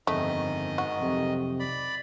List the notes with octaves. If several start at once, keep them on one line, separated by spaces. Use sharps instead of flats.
G1 F2 G#2 D#3 A3 D#5
F#4
B1 F2 C3
D5 B5